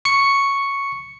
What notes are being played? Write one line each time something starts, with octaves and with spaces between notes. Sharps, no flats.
C#6 C#7